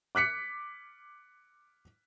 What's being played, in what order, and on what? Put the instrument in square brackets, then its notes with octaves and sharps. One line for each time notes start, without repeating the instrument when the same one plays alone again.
[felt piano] D6 F#6 B6 C#7